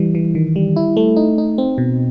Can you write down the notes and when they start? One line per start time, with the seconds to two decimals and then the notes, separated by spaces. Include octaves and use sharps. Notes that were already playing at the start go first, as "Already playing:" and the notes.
Already playing: E3 G3
0.15 E3
0.35 D#3
0.56 G3
0.76 E4
0.97 A3
1.16 D#4
1.38 D#4
1.58 C4
1.78 B2